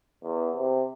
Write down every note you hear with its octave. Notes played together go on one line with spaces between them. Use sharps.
E2
C3